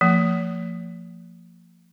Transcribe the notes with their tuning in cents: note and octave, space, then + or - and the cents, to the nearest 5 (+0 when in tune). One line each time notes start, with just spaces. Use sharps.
F3 +0 A#3 -45